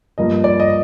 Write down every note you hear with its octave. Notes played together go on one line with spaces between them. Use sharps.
G2 F3 A#3 D#5
D5
D#5